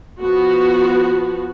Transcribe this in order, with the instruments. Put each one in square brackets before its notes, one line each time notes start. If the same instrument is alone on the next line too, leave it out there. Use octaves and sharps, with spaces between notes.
[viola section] F3 B3 F#4